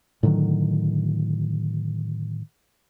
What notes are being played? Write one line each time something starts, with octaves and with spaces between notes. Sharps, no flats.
A2 D3 D#3 F#3